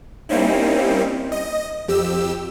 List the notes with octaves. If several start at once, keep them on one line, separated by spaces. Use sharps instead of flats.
G3 A#3 C4 C#4 D#4 E4
D#5
F2 G4 E6